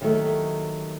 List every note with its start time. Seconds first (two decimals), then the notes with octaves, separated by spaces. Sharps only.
0.01 D#2 D#3 F#3 A3